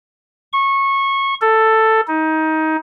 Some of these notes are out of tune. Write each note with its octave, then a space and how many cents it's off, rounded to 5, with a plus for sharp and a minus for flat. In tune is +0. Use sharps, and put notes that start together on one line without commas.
C#6 -20
A4 +10
D#4 +20